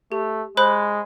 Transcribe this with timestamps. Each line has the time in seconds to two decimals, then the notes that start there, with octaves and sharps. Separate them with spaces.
0.12 A3 G4
0.57 G#3 C5 B5 F#6